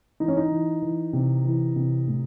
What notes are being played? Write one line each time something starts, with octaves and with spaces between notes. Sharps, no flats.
E3 D#4
C#4
D#4
E3
E3
C3
E3
C3
A2